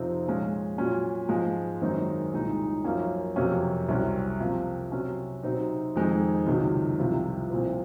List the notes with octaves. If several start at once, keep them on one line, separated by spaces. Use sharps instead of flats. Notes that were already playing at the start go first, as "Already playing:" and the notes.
Already playing: F2 C3 F3 C4 D#4
A#2 F3 G#3 C#4
A#2 F#3 C#4
G#2 F3 G#3
F#2 D#3 G#3 C4 D#4
C2 A#2 G#3 D#4
F#2 F3 A#3 C#4
F2 C3 F#3 A#3 C#4
C2 C3 F#3 C#4
C3 F3 A#3
C3 F#3 C#4
C3 F#3 C4 D#4
F2 D#3 G#3 C4 D#4
C#2 C3 D#3 F#3
C2 C3 F3
C2 A#2 F3 C4